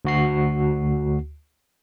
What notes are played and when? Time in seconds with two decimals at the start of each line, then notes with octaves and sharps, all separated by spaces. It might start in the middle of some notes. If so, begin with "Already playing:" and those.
0.05 D2 F#4 C7